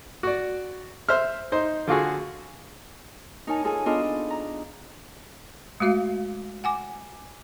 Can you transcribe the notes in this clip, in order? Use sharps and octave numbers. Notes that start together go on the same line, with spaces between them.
F#4 D5
C5 E5 F6
D#4 C5
D3 F4 F#4 G#4
D#4 A#4 C#5 G#5 A5
D#4 F4 G#4 A4 G#5
B3 D4 F4 G#4 A4 D#5
F4
A#5
G#3 A3 F#4 F5
F#5 G#5 D6